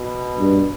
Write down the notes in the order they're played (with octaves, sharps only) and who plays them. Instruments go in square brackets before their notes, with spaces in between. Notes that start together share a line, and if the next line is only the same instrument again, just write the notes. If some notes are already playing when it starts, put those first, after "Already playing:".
Already playing: [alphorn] B2
[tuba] G2